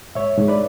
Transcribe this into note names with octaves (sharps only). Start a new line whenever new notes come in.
G#2 C#5 E5
G#2
B4 D5